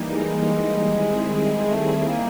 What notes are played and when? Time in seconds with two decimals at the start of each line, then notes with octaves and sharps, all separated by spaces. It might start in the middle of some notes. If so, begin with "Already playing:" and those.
Already playing: E3 G3 A#3 D#4
0.09 G#3
0.87 D#3 G3 C4 E4 G#4
1.65 A3
2.04 A#3